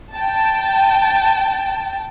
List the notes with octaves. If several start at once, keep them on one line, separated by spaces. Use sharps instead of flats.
G5 A5